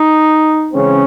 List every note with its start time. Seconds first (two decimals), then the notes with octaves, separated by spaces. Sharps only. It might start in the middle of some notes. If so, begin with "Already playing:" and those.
Already playing: D#4
0.72 C#3 E3 G#3 C4 C#4